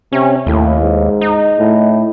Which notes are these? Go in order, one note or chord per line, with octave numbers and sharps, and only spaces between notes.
C3 C#4
D#2 A2
G#2
D#4
A2